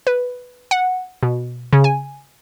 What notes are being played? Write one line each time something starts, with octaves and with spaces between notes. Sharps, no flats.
B4
F#5
B2
C#3
G#5